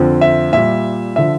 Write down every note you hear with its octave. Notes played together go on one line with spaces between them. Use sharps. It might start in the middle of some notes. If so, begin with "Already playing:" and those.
Already playing: F2 D3 F3
E5
A#2 G3 E5
D3 F3 E5